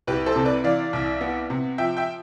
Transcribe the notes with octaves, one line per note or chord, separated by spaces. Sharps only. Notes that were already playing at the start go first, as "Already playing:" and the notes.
C2 G4 B4
A4 C5
C3
B4 D5
E3 D5 F5
C2
B3
C3
F3 E5 G5
E5 G5